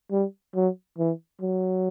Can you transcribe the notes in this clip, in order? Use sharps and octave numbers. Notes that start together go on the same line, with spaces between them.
G3
F#3
E3
F#3